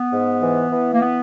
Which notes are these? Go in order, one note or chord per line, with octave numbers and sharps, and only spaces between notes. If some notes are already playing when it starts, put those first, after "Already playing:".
Already playing: B3
G#2
E3
E3
A#3
B3